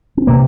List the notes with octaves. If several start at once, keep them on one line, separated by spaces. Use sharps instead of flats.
C4
C3 A#3